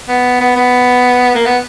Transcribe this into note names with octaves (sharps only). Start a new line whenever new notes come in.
B3
B3
B3
A#3
B3